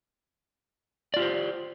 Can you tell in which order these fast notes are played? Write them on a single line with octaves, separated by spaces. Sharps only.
D5 F4 G4 C5